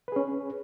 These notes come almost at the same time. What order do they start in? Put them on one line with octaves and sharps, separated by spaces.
B4 G#4 C#4